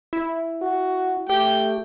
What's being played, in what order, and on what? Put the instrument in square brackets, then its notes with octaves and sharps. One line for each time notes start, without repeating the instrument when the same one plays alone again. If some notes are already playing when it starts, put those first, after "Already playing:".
[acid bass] E4
[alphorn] F#4
[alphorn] A3 [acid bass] G4 [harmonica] G5